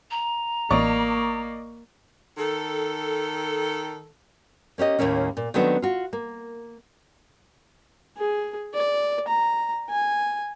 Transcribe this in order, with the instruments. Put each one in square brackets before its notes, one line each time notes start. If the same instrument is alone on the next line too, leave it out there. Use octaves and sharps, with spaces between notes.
[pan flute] A#5
[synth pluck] A1 [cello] A#3 [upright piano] D5 D#5 C#6
[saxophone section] D#3 A4
[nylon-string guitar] A#3 C#4 G4 D#5
D#2 A2 C3 A#3 C#4
A#2
D#3 F#3 A3 B3 C4 D4
F4 F#4
A#3
[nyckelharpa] G#4
D5
A#5
G#5